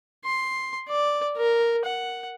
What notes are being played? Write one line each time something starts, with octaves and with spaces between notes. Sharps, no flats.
C6
D5
A#4
F#5